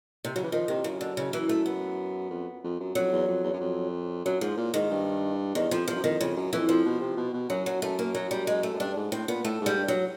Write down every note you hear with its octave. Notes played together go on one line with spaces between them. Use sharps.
C3
C#3 F#3
E3
D#3 F3
C3 D#3
F#2 C#3
D3
C#3
E3
A3
B3
F2
F2
F#2
F2 F#3
E2
F2
E2
F#2
F2
F#2 F#3
G#2 F3
A#2
G#2 D#3
G2
E2 D#3
F2 F3
E2 F3
F#2
F2 D#3
F2 C#3
F#2
F2 E3
F2 F3
B2
C3
B2
B2
F#2 F#3
F#3
F#2 A3
A#3
F#3
G3
G#3
A3
F#2
G2 D4
G#2
A2 C4
A#2 B3
A2 A3
G#2
G3
G2
F#3